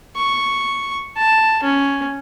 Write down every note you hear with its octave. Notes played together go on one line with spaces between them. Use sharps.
C#6
A5
C#4